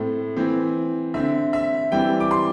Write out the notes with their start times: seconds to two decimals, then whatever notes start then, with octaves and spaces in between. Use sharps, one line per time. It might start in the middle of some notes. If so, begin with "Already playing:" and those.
Already playing: A2 A3 C4
0.36 E3 C4
1.14 D3 C4 E5
1.53 E5
1.92 E3 G3 C4 G5
2.20 D6
2.31 C6